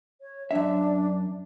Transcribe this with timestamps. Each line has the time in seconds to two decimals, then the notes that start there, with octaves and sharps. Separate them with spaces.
0.21 C#5
0.51 F#2 D4 E5